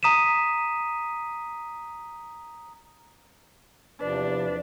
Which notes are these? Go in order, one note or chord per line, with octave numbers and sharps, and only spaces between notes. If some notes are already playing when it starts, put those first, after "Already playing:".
A#5 D#6 B6 D#7 E7
E2 C3 F3 D4 B4 D5